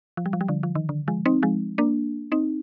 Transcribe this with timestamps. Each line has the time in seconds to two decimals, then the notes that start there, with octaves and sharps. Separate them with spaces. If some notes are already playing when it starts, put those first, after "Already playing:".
0.17 F3
0.26 G3
0.33 F3
0.41 G3
0.48 D3 F3
0.63 F3
0.75 D#3
0.89 D3
1.08 F3 G#3
1.26 C4 D#4
1.43 F3 G#3
1.78 A#3 D4
2.32 C4 D#4